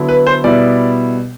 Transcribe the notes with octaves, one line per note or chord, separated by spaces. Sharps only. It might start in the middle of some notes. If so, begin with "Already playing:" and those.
Already playing: D3 F#3 B3 E4
B4
C5
B2 G3 B3 E4 D5